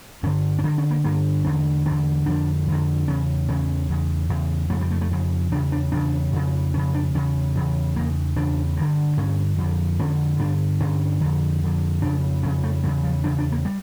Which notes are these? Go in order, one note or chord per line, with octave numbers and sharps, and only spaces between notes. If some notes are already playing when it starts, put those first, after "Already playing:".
G2 D3 C#4
C#4
G2 D3 D4
C#4
A#3
G2 D3 A#3
E2 D3 C#4
E2 D3 D4
F2 D3 D4
F2 D3
E2 C#3 C#4
E2 C#3 C#4
E2 C#3
E2 C#3
F2 C#3 A3
G3
A3
A3
F2 C#3
E2 C#3 D4
D4
E2 C#3 D4
F2 C#3
F2 C#3 C#4
D4
E2 C#3 C#4
E2 C#3
E2 C#3 A#3
E2 C#3 D4
G2 D3
G2 D3 C#4
F2 D3
F2 D3 C#4
G2 D3 D4
G2 D3 C#4
F2 D3
F2 D3
F2 C#3 D4
F2 C#3 C#4
A3
E2 C#3 G3
F3
E2 C#3 D4
D4
A#3
G3